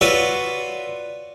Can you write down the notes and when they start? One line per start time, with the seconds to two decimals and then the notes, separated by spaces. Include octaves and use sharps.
0.01 F4 F#4 B4 C#5 D5 E5